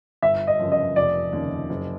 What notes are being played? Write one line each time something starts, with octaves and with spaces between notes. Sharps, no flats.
G1 E5
D#5
F#2 C#3 F3
D#5
F1 D5
D#2 C#3
F#1